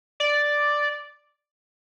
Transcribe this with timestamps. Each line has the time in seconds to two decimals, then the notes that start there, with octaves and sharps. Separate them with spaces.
0.20 D5